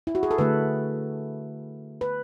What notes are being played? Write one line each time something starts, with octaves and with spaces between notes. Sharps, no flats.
E4
F#4
G#4
A4
D3 A3 B4
B4